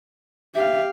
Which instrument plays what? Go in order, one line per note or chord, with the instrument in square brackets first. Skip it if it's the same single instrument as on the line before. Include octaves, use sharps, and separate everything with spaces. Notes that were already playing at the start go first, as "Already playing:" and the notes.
[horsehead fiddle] G4 F5 [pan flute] E5